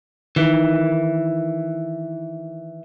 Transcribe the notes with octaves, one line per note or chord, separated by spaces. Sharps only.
D#3 E3